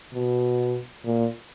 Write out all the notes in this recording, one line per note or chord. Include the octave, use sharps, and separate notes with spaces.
B2
A#2